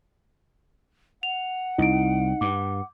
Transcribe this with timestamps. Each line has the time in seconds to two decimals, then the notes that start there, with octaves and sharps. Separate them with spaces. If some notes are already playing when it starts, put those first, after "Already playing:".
1.23 F#5 F7
1.78 C2 D#4 E4 D7
2.41 G2 D6